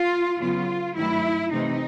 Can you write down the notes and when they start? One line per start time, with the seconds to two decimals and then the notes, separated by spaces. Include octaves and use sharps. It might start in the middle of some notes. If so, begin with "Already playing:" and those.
Already playing: F4
0.40 C#3 F#3 B3 F4
0.96 G2 D#3 F#3 A3 E4
1.52 C3 E3 A3 C4 D#4